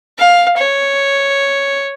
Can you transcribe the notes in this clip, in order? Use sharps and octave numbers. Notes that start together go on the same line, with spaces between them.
F5
C#5